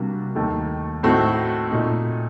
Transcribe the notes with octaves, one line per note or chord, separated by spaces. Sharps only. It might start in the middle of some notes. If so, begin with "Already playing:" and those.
Already playing: C3 G3 A#3 D4 F#4
D#2 D#3 A3
A2 A3 C4 D#4 F#4
A#2 A3 D#4